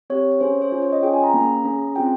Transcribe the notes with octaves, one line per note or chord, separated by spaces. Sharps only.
C4 G4 C#5
C#5
C#4 G#4 C5
C5
C#4 F4 G#4 C#5
C#5
D#5
C#4 F4 G#4 G5
G#5
A#5
A#3 C#4 G#4
C#4 G#4
C4 F4 G#4 G5